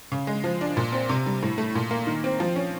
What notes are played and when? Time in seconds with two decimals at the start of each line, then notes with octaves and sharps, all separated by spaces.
0.12 C#3
0.27 G#3
0.44 F3
0.61 D4
0.77 A#2
0.92 C4
1.09 C3
1.26 G3
1.43 A2
1.58 A3
1.75 A#2
1.91 A#3
2.07 D#3
2.24 C4
2.40 F3
2.56 C#4